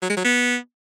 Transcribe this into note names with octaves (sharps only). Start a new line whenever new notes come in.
F#3
G#3
F#3
B3